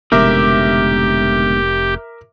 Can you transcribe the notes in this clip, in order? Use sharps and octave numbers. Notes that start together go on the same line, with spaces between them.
F1 G#2 B2 D3 G4 A#4 E5 D6